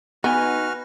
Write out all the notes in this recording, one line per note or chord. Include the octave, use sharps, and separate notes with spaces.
B3 D#4 F#4 B4 G#5 F6